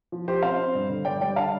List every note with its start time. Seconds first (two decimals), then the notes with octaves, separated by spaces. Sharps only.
0.12 F3
0.28 F3 G4 C5
0.43 C4 C5 F5
0.59 C4
0.75 G2
0.89 D3
1.05 G2 D5 G5
1.21 G3 D5 G5
1.36 D3 F5 A5